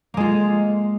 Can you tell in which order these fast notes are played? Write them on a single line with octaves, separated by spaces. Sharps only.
A#3 G#3 F4